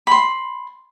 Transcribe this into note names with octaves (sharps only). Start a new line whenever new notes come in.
B5 C6